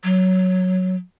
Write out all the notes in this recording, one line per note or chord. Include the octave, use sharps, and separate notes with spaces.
F#3